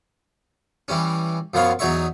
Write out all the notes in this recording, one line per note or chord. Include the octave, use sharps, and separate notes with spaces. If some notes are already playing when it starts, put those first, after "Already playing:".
E3 G3 C#4
F#2 F3 B3 C#5 F5 C#6
E2 F#3 D#4 C#5 E5 C#6